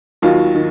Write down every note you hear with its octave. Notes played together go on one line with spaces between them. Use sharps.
D#2 D#3 F#3 F4
D#3